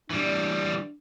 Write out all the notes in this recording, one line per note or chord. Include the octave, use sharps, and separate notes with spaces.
E3 G3 D4